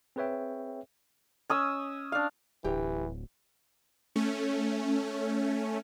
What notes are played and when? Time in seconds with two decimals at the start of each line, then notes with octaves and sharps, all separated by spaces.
0.16 C4 G#4 B4 C#5 E5 G5
1.50 C#4 D#6 E6
2.12 D4 F5
2.64 D1 E3 G4 G5
4.16 A3 C#4